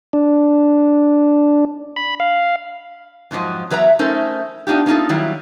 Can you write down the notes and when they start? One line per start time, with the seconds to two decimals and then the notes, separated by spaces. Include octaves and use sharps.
0.13 D4
1.96 B5
2.20 F5
3.31 F2 G#2 F3 F#3 D#5
3.70 E2 F#3 B4 E5 A#5
3.99 A3 C#4 D#4 A4 A#4 C5
4.67 B3 D4 D#4 F4 G4
4.86 A#3 B3 C#4 D#4 F4 A4
5.09 D#3 F#3 G3 A#3 E4